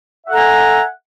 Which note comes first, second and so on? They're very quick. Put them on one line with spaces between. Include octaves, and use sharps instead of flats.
E5 F#5 A4 A#5 G#5